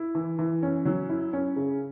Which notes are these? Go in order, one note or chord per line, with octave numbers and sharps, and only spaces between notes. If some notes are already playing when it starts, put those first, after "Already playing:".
Already playing: E4
E3
E3
C#4
F#3
E4
C#4
C#3